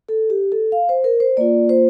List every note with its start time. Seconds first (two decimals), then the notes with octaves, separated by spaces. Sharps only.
0.09 A4
0.30 G4
0.52 A4
0.72 F5
0.89 C5
1.04 A#4
1.20 C5
1.37 A#3 F4 D5
1.69 C5